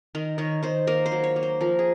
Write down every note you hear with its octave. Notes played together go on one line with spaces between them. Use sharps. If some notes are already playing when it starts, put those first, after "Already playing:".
D#3 A#4
D#3 C#5
D#3 C5
A#3 A#4
C5
F#3
C#5
A#3
C5
F3 A#4
G#4